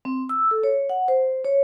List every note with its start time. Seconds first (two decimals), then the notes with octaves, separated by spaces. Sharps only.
0.05 C4
0.29 E6
0.51 A4
0.63 C#5
0.90 F#5
1.08 C5
1.45 C#5